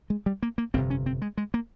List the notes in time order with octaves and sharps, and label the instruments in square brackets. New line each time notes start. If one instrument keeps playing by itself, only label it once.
[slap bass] G#3
G3
A#3
A#3
G1 F2 C3 C4
C#4
C4
G#3
G#3
A#3